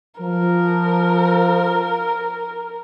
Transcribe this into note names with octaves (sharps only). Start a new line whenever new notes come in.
F3 A#4